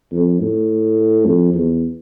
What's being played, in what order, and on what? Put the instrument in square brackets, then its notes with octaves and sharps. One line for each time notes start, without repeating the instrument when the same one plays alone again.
[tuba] F2
A2
F2
E2